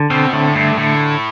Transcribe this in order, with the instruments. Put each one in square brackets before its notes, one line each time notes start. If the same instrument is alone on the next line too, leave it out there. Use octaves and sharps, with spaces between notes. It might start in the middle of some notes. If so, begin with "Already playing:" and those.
Already playing: [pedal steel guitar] D3
[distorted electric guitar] B2 [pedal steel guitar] C4
[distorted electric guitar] A2 [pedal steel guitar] D3
[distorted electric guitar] G2 [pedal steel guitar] A3
[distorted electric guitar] A2 [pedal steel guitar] D3